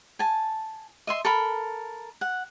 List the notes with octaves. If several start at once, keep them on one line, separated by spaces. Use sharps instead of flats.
G#5 A5
D#5 E5 C6
A4 A#4 B5
F#5